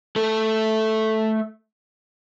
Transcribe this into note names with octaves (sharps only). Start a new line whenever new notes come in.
A3 A4